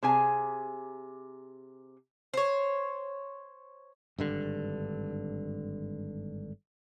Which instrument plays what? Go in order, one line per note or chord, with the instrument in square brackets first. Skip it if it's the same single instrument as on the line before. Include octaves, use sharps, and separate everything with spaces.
[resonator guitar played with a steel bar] C3 G#4 G#5
[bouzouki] C5 C#5
[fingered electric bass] G#1 G2 D3